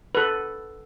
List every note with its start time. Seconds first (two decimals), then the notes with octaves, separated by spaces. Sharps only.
0.15 A4 B4